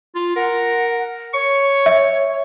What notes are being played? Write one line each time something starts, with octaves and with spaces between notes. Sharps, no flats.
F4
A#4 F#5
C#5 C#6
E5